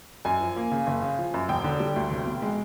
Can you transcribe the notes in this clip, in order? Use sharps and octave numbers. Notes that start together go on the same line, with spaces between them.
F#2 G#5
F3
A#3
C#3
F#1
C#3
F3
F#2
E1 G5
D3
G3
D2
F1
B2
G#3